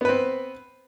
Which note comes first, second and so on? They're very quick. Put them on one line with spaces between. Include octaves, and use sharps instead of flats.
B3 B4 C4